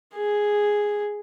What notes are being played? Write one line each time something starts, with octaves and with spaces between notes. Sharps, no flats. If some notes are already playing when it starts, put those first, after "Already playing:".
G#4